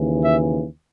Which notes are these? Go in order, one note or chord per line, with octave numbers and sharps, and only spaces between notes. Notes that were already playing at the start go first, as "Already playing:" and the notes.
Already playing: D#2 C#3 E3
E5